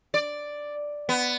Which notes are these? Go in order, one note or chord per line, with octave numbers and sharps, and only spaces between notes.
D5
B3